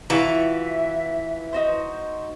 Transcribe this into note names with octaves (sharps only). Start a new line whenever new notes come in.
E3 F4 F#4 E5 C#6
D#4 F#4 C5